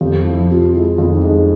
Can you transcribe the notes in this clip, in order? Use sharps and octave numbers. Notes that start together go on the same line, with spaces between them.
F2 G4
F3 E4
C3 F4
G#3 E4
F4
F2 E4
D#4
G#3